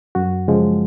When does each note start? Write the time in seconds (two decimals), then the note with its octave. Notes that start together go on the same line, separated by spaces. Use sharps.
0.15 F#2 F#4
0.48 C#3 F3 G#3